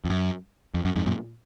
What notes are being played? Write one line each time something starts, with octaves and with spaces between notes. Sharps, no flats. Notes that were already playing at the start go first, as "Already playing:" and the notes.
F2
F#2
F2
F#2
F2 G#2
F#2 A#2